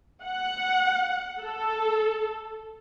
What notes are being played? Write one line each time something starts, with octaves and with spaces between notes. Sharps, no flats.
F#5
A4